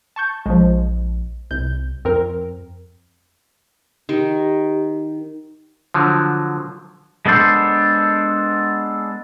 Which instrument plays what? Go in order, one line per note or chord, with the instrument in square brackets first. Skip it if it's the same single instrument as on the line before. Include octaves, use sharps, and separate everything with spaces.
[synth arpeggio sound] A5 C#6 G6
[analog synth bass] A#1 [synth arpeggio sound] F3 G#3
[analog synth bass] C2 [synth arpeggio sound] G6
[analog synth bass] F2 [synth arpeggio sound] C4 A#4
[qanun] D#3 [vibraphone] G4
[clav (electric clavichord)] D3 F3 F#3
[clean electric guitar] G#3 B3 D4 A4 C5